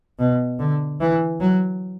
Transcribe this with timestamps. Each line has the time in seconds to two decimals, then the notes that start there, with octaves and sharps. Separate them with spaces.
0.19 B2
0.59 D3
1.00 E3
1.40 F#3